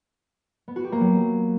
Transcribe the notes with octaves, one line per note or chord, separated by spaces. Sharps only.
B3
F#4
G4
A#3
F#3